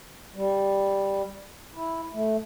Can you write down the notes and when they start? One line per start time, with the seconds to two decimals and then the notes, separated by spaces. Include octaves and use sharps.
0.35 G3
1.74 E4
2.13 A3